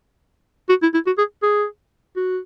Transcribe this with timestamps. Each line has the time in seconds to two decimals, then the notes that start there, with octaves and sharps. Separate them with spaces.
0.69 F#4
0.82 E4
0.94 E4
1.07 F#4
1.18 G#4
1.43 G#4
2.17 F#4